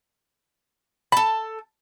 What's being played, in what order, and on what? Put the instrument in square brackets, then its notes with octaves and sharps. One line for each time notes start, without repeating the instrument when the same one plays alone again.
[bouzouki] A4 A5 [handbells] B5